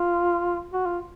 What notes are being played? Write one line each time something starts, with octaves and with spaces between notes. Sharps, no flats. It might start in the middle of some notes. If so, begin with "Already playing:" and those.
Already playing: F4
F#4
F4